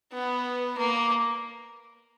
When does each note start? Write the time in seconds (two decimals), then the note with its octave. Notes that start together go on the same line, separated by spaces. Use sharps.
0.13 B3
0.78 A#3